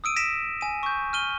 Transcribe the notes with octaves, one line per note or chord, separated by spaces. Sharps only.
D#6 E6 D7 D#7
A#6 B6 D7 E7
G#5 D#7
C#6 G6
F6 D#7 G7